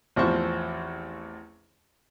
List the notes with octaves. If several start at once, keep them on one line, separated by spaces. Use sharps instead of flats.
A1 E2 F3 C4 C5 C#6